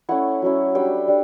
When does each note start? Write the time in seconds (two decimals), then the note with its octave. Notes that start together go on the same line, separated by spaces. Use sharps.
0.09 A3 C#4 E4 F#5
0.42 F#3 C#4 E4
0.75 G3 D4 G5
1.08 G3 D4